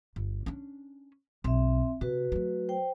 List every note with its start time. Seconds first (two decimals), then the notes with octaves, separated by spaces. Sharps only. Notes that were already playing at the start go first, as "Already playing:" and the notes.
0.16 G1
0.46 C#4 D4
1.44 B1 C4 E5
2.01 C3 F#4 B4
2.32 F#3 A3
2.69 C5 G5